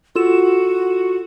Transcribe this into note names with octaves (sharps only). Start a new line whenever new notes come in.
F4 F#4 A4 E7